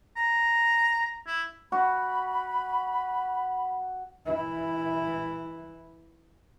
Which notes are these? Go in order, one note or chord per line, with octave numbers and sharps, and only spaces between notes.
A#5
E4
F#4 B5
E3 E4